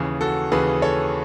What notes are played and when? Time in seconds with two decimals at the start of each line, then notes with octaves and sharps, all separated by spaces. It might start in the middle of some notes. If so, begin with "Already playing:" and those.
Already playing: D#2 C#3 E3 G#4
0.21 F#4 A4
0.52 D#2 C#3 E3 G#4 B4
0.82 A4 C#5